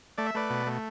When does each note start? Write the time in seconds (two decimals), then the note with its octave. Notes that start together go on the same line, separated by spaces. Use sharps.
0.18 A3 D5
0.26 E5
0.35 A3 B4 D5
0.50 B2
0.67 A3